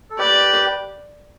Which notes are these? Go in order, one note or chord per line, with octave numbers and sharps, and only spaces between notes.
A4
G4 B4 D5